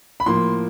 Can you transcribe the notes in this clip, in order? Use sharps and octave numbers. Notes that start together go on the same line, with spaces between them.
B5
A2 F3 A#3 C6